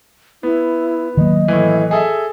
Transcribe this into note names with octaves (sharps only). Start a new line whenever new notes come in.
B3 E4
D#3 F#3 A#3 D#5
A2 E3
G#4 A4 E5